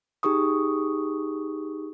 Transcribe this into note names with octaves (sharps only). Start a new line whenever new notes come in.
D#4 G4 G#4 C#6 D#6